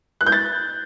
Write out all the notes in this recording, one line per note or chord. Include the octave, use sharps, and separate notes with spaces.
F#6
G6
A6